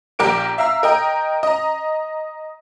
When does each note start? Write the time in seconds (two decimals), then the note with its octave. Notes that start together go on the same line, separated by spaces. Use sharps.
0.19 A#1 G4 A#4 D6 D7
0.58 E5 F5 A#5 E6
0.83 A#4 D#5 G5 A#5
1.43 D#5 A#5